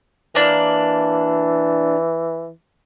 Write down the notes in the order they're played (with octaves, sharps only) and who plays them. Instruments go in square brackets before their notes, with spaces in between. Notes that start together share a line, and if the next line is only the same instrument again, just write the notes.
[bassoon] E3 [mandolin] A#3 D4 E4